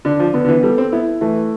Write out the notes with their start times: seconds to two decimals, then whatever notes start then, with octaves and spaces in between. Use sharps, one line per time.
0.05 D3 D4
0.19 F3
0.34 D3 B3
0.45 D3
0.49 E3
0.63 G3 A4
0.78 C4
0.92 B3 E4
1.21 E3 A3